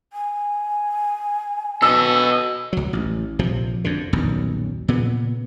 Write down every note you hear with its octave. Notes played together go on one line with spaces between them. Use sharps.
G#5
B2 A4 D#5 E6
C#2 F#3
A1
A#1 C3 F3
F2 D3
D#1 B1 F#2
A#2 C#3 B3